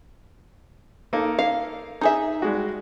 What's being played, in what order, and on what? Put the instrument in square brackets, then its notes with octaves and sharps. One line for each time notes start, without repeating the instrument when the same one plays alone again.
[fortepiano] A#3 D#4 A4
[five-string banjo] F5
D#4 G#4 E5
[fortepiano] G3 G#3 F#4